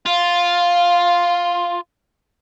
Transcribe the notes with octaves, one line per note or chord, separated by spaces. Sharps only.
F4 F5